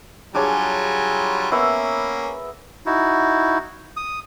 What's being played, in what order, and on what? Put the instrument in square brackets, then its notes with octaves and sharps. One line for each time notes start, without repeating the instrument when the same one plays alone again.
[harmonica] F#3 G3 F4 [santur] D4 G#4 C#5
[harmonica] A#3 C#4 [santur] B3 E5 C#6
[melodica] D#4 E4 F#4
D#6